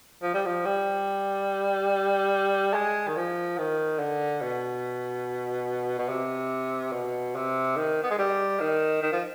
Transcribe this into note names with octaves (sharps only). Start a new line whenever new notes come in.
F3
G3
F3
G3
G#3
D#3
F3
D#3
D3
B2
B2
C3
B2
C3
D#3
B3
G#3
G3
D#3
D#3
F3